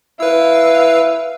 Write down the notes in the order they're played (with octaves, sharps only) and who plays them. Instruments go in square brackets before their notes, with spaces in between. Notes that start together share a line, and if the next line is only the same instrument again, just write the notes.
[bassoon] E4 [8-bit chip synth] B4 E6 [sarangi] F5